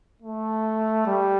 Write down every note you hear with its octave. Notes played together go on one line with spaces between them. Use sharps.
A3
G3